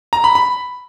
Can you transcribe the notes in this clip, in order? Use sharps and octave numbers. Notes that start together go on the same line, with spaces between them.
A#5
B5
B5